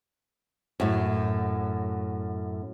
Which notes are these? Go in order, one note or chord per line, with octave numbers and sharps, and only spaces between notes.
F#2 A2